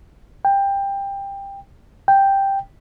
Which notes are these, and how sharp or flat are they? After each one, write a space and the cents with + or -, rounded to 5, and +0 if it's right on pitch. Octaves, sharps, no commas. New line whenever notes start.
G5 +15
G5 +0